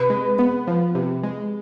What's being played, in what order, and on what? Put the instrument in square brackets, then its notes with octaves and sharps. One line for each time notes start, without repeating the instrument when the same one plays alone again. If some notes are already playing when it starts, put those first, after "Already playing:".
Already playing: [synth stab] C3 [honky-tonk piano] B4
[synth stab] G#3
B3
F3
C3
G#3